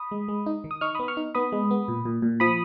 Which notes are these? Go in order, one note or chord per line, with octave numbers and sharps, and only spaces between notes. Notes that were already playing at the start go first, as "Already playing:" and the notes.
Already playing: B5 D#6
G#3
G#3
D#4
D#3
D#6
D#4 C#6 F6
B3 B5 D#6
C#6 F6
D#4
B3 B5 D#6
G#3
B3
A#2
A#2
A#2
F3 B5 D#6